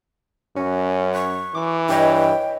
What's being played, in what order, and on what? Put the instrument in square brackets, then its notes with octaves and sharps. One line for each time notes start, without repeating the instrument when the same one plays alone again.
[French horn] F#2 [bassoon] C#4 [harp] F#4
[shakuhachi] C#6 [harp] F#6 B6
[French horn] E3 [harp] D6
[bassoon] G2 [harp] E4 C#5 D#5 [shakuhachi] G5